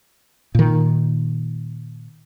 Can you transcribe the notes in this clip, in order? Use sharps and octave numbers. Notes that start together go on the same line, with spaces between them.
A#2 D#3